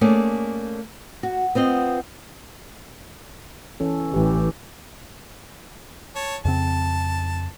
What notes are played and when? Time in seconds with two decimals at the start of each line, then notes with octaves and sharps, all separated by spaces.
0.01 A3 A#3 C#4 G#4 D5
1.23 F#4
1.55 B3 C4 F4 D#5
3.80 E3 C#4 A4
4.14 A1 E3 G4
6.15 C#5 A5
6.45 F2 C#3 C4 A5